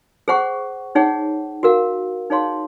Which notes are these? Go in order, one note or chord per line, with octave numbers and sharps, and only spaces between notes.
G#4 C5 F#5 C#6
D#4 G#4 C#5 F#5
F#4 A#4 F5
D#4 G#4 C#5 F5 C6